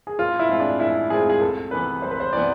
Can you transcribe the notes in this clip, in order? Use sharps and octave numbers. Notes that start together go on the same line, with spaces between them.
G#4
A1 F4
E4
A2 G#3 C4 F4
D4
A1 E4
A2 G#3 C4 F4 G#4
G#4
C2 A4
C3 E3 B3 B4
C2 C5
B4
C5
C3 E3 B3 D5